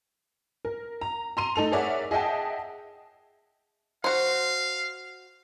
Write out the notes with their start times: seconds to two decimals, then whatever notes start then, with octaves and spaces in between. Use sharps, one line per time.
0.65 A#4
1.01 A#5
1.37 A#5 C6 D#7
1.56 A3 D#4 A4 F7
1.72 G#4 A#4 C#5 D5 E5 F#5
2.11 G#4 D#5 E5 F#5 G5 A5
4.04 F#4 C5 F5